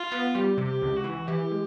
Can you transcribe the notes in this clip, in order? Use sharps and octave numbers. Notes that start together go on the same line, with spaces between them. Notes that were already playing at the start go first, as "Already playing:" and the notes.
Already playing: F4
B3
G3 G4
C3
G4
C#2
F#4
E3
E3 G4
G#3